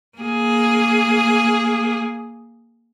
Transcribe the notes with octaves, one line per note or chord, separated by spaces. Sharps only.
A#3 G#4